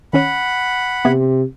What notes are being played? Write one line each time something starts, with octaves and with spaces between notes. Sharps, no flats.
D#3 C#4 C#5 F#5 B5
C3 B3 E5 G#6